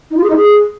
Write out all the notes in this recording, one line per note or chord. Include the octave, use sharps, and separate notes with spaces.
D#4
F4
G#4
D#4
G#4